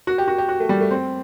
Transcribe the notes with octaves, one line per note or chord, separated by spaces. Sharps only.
F#4
G4
F#4
G4
F#4
A3
G3
A3
C4